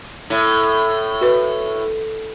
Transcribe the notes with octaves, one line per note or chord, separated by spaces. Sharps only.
A2
F#4 B4